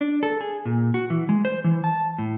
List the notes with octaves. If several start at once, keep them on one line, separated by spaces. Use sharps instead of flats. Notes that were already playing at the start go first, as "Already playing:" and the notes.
D4
A4
G#4
A#2
F#4
E3
G#3
C5
E3
A5
A2